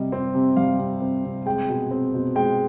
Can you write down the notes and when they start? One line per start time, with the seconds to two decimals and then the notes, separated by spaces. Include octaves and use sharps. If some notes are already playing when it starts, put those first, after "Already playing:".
Already playing: C3 G3 D#5
0.12 C4
0.35 C3
0.57 G3 F5
0.79 C3
1.01 C4
1.24 C3
1.46 G#3 G5
1.69 B2
1.91 C4
2.14 B2
2.36 G#3 G5